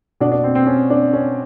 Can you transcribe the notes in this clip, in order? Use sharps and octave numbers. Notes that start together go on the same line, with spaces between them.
B2 D4
D4
C4
C4
C#4
D4
C#4